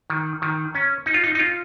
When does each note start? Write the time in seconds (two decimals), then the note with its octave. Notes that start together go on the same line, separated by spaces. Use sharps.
0.10 D#3
0.42 D#3
0.75 C#4
1.06 D#4
1.14 F4
1.24 D#4
1.35 D#4
1.39 F4